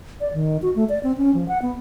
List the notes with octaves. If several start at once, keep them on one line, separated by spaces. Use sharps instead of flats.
D5
D#3
F#4
A3
D5
C4
C#4
F3
F#5
B3